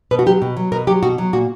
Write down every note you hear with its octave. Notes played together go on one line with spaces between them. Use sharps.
B2 B4
F#4
F#3 G4
B2
F#3
B2 A#4
F#3 G4
B2 F#4
F#3
A#2 F#4